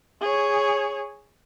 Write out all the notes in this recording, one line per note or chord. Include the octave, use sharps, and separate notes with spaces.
G#4 C#5